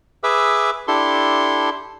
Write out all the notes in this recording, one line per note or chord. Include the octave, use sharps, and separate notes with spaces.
G#4 B4 E5 D6 E6
D4 E4 G4 A4 C6